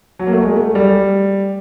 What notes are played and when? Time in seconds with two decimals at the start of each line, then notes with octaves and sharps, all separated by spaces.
0.19 F#3
0.27 A#3
0.32 A3
0.44 G#3
0.56 A3
0.75 G3